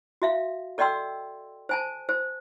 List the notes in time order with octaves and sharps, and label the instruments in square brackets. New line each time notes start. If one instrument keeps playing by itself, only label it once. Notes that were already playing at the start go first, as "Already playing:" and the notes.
[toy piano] F#4 E5 F5
A4 D5 D#5 G5 C6 E6
C5 G#5 A5
C5